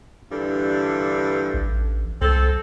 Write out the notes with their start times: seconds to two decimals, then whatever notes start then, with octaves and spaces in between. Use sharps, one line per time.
0.31 G2 D3 E3
1.54 A1
2.21 C2 C4 A4